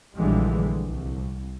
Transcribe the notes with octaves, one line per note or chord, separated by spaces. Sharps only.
A#1 D3 E3 G3 G#3
C2